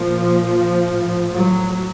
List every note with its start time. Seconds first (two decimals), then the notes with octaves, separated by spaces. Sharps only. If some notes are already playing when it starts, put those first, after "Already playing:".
Already playing: A#2 F3
0.83 A2
1.33 F#3